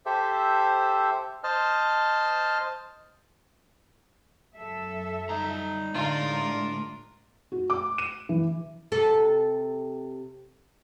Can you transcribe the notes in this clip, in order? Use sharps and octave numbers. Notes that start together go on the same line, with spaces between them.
G4 A4 C5 E5
C5 D#5 A5 F6
F#2 A4 E5
G3 D#4 A#5
A2 D3 G#3 D4 F4 A#4
F#4
D6
D#7
E3
C3 A4